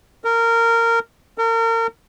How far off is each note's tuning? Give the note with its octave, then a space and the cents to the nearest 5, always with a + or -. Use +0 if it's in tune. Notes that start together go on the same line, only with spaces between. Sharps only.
A#4 -15
A#4 -35